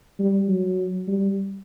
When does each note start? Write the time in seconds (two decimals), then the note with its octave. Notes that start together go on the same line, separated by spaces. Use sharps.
0.19 G3
0.48 F#3
1.08 G3